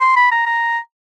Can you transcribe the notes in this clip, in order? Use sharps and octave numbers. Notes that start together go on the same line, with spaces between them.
C6
B5
A#5
A#5